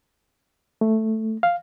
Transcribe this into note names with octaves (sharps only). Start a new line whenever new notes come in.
A3
F5